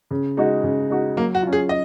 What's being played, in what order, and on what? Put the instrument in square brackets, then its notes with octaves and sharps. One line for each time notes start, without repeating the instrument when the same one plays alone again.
[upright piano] C#3
G#3 D#4 F#4
C#3
G#3 D#4 F#4
[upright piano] F#3 [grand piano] A#3
[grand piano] F#4
[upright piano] C#4 F4
[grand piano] G#4
D#5